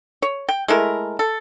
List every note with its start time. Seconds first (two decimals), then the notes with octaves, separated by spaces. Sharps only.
0.22 C#5
0.49 G5
0.68 G#3 A3 E4 A#4
1.19 A4